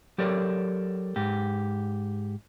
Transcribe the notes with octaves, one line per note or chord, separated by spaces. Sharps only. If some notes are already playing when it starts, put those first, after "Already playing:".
F#3 G4 A4 A#4 C#5 D5
G#2 G4